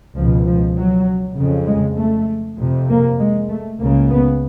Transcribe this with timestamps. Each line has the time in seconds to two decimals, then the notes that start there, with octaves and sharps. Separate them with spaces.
0.15 C#2 B2 F3
0.45 F3
0.75 F#3
1.36 F2 C#3
1.66 G#3
1.98 A3
2.58 F2 C3
2.88 A#3
3.19 G#3
3.49 A3
3.79 C#2 C#3 A#3
4.09 B3